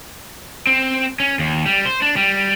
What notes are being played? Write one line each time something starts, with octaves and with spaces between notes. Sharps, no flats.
C4
C#4
D#2
G3
C5
D4
G3